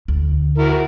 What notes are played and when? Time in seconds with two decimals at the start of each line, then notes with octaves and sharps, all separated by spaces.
0.08 D2
0.58 E4 F#4 A#4